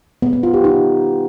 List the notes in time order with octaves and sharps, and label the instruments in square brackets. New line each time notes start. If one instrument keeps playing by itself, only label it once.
[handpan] B3
B3
F4
G4
D#4